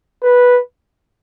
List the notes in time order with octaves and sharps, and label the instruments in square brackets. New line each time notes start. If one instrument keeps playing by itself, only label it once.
[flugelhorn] B4